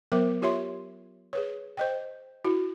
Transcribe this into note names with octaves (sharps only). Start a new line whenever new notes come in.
F#3 B3 A#4 C5 E5 D6
F4 G4 C#5 E5 C6
G#4 B4 C#5
C5 D#5 G5
E4 F#4